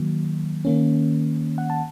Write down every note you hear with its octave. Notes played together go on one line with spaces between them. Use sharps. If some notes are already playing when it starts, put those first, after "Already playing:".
Already playing: D#3 F#3 A#3
D#3 A#3 C#4
F#5
A5